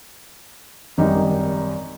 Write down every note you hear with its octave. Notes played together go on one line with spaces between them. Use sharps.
G#1 F#2 G3 D#4